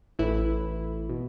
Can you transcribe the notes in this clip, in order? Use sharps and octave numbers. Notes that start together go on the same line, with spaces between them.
A1 A2 E3 E4
B2